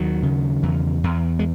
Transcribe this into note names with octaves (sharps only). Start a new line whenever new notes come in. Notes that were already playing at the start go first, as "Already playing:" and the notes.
Already playing: D#2 D#3 F#3
C#3
E2
E2
G#3